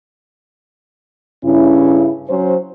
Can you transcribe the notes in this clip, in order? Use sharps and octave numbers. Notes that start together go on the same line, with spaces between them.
G2 C#3 C#4 E4
F#3 C#4 C5